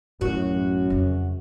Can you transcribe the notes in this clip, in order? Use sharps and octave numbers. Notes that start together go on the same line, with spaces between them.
A1 F#2 A2 F#4
F2 C#3